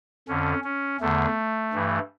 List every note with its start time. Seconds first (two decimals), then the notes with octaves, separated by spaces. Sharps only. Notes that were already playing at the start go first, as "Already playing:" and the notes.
0.28 F2 D3 C#4
0.64 C#4
1.01 E2 D3 A3
1.73 G2 E3